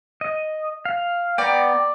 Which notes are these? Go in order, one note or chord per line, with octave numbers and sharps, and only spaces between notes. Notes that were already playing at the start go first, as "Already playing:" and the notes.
D#5
F5
B3 D5 G5 A#5